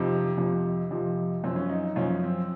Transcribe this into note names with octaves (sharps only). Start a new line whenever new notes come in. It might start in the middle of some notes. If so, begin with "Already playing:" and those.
Already playing: F2 C3 F3 D#4
F2 C3 F3
F2 C3 F3
F#2 F3 C4
C#4
D#4
D#4
F#2 F3 C#4
C4